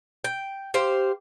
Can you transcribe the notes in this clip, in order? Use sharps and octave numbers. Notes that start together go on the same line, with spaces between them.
G5
G4 C5 F5